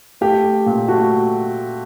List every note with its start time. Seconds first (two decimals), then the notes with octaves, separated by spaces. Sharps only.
0.21 A3 G4
0.44 A3
0.66 A#2
0.88 A3 F#4